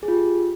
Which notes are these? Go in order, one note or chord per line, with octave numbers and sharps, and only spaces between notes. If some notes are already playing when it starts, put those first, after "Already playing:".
G#4
F4
G4